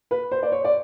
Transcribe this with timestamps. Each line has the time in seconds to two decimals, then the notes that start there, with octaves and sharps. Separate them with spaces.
0.11 B4
0.32 C5
0.43 D5
0.52 C#5
0.65 D5